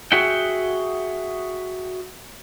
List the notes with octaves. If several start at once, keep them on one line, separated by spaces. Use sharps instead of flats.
F#4 G#4 E5 F#5 G5